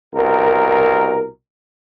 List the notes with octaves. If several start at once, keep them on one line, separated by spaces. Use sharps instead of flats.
C2 B2 A#4